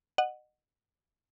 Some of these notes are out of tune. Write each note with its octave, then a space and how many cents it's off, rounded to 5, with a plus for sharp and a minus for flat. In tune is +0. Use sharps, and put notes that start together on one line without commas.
D#5 -30 F#5 +0